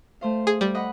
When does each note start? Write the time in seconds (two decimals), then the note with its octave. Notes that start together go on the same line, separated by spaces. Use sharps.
0.21 A3 C5 F5
0.47 G#4
0.61 G3
0.75 D#5 F#5 B5